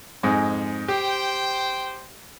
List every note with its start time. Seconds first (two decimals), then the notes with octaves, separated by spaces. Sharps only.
0.23 F2 G#2 G#3
0.88 G4 C5 G5